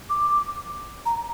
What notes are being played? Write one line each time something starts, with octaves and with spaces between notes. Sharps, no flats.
D6
A#5